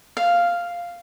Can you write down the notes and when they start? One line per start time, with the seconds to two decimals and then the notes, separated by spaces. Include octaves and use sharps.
0.17 F5